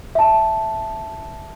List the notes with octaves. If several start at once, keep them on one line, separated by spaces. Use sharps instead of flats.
E5 A5